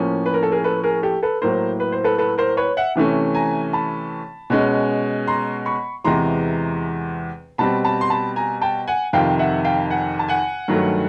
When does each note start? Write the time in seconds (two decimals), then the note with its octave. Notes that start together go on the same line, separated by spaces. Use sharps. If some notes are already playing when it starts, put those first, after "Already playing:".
Already playing: A2 F3 A#3 C#4
0.26 B4
0.34 A#4
0.43 A4
0.52 G#4 A#4
0.64 A4 B4
0.84 G#4 A#4
1.03 G4 A4
1.23 A4 B4
1.41 A2 F#3 A#3 A#4 C5
1.80 B4
1.92 C5
2.04 A4 B4
2.18 A4 B4
2.38 A#4 C5
2.57 B4 C#5
2.77 E5 F#5
2.95 C3 E3 A3 C#4
3.35 G#5 A#5
3.73 A5 B5
4.50 B2 G#3 C#4
5.27 A#5 C6
5.66 B5 C#6
6.04 E2 C3 E3 G#3 A#5 C6
7.58 B2 G3 C4 A5 B5
7.85 A5 B5
8.01 C6
8.10 A5 B5
8.36 G#5 A#5
8.62 G5 A5
8.87 F#5 G#5
9.13 F2 C3 D#3 F5 G5
9.39 E5 F#5
9.65 F5 G5
9.90 F#5 G#5
10.19 A5
10.28 F#5 G#5
10.68 G2 D#3 F#3 A3